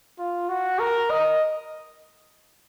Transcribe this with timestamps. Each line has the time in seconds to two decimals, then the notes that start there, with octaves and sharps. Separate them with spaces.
0.19 F4
0.49 F#4
0.79 A#4
1.11 D#5